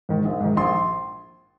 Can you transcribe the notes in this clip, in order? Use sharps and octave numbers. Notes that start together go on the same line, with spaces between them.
G#2 D#3
A#1
G#2 D#3
A#1 C6